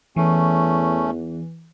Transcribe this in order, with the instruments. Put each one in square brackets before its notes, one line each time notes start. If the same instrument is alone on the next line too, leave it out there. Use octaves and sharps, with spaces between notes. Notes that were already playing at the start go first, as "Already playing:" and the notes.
[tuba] E2 [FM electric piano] E3 [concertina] A3 C#4